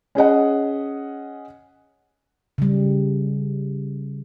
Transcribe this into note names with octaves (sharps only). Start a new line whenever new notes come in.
C#4 G#4 D#5 F#5
C#3 G3